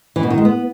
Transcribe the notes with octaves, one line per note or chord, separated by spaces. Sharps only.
E3
B2
D#3
G#3
B3